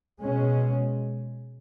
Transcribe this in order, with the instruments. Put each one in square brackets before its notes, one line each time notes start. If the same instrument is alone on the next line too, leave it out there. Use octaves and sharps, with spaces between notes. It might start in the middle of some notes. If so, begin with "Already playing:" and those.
[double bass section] B2 G#3 C#4